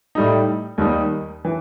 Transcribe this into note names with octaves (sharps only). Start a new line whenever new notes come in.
A2 G3 D#4
D#2 D#3 G3 D#4
E3